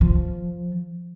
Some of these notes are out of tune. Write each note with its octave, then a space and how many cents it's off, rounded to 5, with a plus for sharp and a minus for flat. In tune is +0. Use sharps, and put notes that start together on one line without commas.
F3 +0